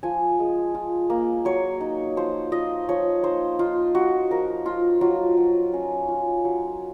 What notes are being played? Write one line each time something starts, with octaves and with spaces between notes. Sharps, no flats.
F3 G#5
G#3
F4
A#3
F#3 C#5
D#4
F3 C5
F4 D#5
F3 C#5
D#4 C5
D#4 F4
D#4 F#4
F3 A#4
F3 F4
F#3 F4
F#3
C#4
F4
F#3